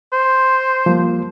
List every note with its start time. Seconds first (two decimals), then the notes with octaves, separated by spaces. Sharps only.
0.13 C5
0.86 F3 G3 A#3